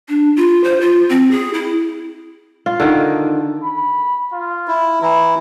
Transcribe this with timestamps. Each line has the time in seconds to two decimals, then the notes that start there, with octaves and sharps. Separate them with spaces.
0.09 D4
0.36 F4
0.64 C5
0.81 F4
1.09 C4
1.31 G#4
1.54 E4
2.66 F4
2.80 D3 D#3
3.63 B5
4.32 F4
4.68 E4
5.02 E3 E4 A#5